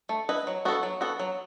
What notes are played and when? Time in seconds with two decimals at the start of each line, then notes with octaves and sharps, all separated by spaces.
0.09 A3
0.29 E4 B4 D#5
0.47 F#3
0.65 B3 F#4 A4
0.83 F#3
1.01 B3 F#4 A4
1.20 F#3